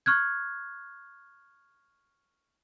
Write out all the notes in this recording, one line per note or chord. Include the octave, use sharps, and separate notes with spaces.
C#6 F6 F#6 G#6